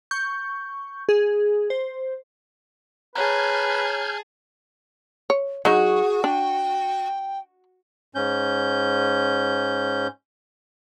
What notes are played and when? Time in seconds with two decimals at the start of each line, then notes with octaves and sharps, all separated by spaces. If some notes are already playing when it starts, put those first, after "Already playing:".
0.11 C#6 G6
1.09 G#4
1.70 C5
3.15 G#4 B4 C#5 A5 A#5 F6 G6 G#6
5.30 C#5
5.65 F#3 D#4 F#4 G#4
6.24 D4 G5
8.15 G#2 C#4 G6